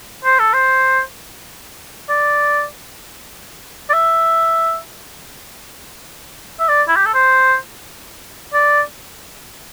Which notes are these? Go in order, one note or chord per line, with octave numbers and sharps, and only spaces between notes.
C5
A4
C5
D5
D5
E5
E5
D5
E4
G4
A4
C5
D5